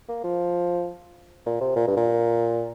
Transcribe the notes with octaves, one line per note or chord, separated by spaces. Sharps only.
A#3
F3
A#2
C3
A#2
G2
A#2